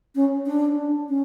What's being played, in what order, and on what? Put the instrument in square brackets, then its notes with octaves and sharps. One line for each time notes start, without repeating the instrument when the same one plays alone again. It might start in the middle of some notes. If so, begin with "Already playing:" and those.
[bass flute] C#4
D4
C#4